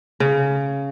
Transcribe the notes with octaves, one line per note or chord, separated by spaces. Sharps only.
C#3